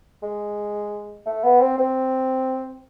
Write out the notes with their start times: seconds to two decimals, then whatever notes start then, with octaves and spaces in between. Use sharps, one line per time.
0.23 G#3
1.26 A3
1.43 B3
1.61 C4
1.78 C4